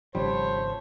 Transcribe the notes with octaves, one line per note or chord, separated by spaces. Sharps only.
G#1 C#3 F3 G3 A3 C5 C#5